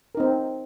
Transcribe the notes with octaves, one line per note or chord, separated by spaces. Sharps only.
C4 D#4 A#4